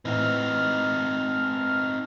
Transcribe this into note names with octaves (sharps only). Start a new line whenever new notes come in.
A2 E3 C4 D#4 F6